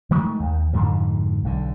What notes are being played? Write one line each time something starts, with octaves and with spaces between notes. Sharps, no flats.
D#3 G#3 A3
D#2 D#3
F2 G#2 D3 F3
B1 D3